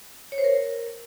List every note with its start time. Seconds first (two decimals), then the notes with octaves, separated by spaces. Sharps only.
0.32 C#5
0.38 C5
0.44 A#4